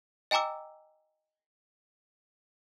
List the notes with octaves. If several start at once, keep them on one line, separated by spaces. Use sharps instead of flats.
D#5 G5 G#5 A#5 D6 E6